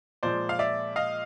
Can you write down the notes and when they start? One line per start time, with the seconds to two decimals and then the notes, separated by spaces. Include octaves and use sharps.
0.23 A#2 F3 G#3 C5 D5
0.49 F5
0.59 D5 E5
0.96 D#5 F5